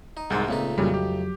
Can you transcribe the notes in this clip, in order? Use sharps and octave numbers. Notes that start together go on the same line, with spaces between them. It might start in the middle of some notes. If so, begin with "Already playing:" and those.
D#4
C2 G#2 G#3 A#4 A5 G6 A6
C#2 A#2 A3 C4 D#4
F2 A#2 C#3 F#3 G3
G4